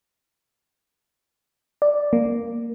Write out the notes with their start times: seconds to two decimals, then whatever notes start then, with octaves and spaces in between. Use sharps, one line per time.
1.82 D5
2.13 A#3